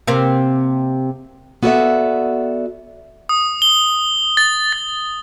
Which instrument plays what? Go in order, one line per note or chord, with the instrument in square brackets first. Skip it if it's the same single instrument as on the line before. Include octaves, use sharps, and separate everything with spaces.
[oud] C3 A#3 C4
[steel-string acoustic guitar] B3 F#4 A4 C#5 D5 E5
[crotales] D#6
G7
A6
A6